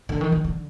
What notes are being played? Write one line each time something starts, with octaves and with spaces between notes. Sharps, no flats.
D3
D#3
D#3
D3